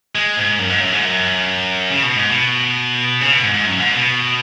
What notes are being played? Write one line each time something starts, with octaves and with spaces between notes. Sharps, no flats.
G#3
G#2
F#2
G#2
F#2
G#2
F#2
C#3
B2
G#2
B2
C#3
B2
G#2
G#2
F#2
G#2
B2